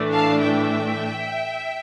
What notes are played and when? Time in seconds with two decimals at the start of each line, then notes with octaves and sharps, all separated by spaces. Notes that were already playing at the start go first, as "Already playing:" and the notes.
Already playing: A2 E3 A3 D4
0.13 F5 A5
0.41 E5 G5